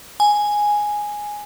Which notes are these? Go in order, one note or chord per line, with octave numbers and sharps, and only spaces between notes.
G#5